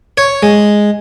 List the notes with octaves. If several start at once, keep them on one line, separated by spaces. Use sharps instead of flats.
C#5
G#3